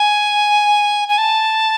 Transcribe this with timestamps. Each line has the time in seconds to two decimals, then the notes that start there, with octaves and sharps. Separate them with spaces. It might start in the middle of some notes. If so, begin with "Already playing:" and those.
Already playing: G#5
1.09 G#5
1.18 A5